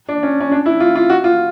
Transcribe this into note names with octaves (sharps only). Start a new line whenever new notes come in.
D4
C#4
C#4
D4
E4
F4
F4
F#4
F4